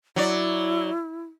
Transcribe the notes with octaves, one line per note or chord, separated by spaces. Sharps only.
F#3 E4 D5